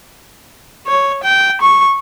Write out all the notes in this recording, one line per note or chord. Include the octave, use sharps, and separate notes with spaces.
C#5
G5
C#6